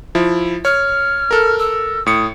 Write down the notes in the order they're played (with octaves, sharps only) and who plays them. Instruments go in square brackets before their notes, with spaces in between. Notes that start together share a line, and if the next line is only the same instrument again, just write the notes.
[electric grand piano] F3 E4
[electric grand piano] C#5 [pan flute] F6
[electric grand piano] A4 A#4
[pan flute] E6
[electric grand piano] A2 C#7 [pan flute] D#6